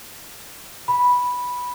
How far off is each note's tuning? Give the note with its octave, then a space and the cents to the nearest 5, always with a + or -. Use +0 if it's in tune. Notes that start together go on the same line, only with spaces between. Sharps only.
B5 -5